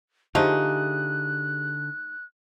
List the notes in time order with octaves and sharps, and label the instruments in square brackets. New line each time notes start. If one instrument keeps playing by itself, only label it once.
[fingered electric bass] D3 [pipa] F3 A3 D#4 [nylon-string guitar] G4 G#4 [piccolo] F#6